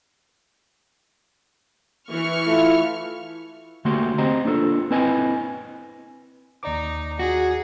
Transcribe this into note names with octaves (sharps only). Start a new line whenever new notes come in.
E3 C#6 F6
A3 E4 F4
D3 A3 A#3 F#4 G4 C6
C4 G4 C5 D#5 A#5
A#3 D4 F4 G#4 A4
C4 E4 B4 D#5 G#5
D#2 D#4 D5 D6
F#4 G#4